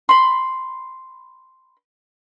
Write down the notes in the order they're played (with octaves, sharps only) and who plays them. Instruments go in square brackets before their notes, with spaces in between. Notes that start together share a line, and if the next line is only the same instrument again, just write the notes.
[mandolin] B5 C6